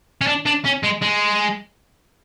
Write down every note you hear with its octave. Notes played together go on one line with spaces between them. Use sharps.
C#4
D4
D4
C#4
G#3
G#3